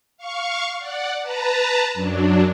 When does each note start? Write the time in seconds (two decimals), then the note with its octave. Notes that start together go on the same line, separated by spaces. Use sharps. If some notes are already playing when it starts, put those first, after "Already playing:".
0.17 F5 C#6
0.78 D5 F#5
1.22 B4 A5 A#5
1.94 F#2 F#3 D4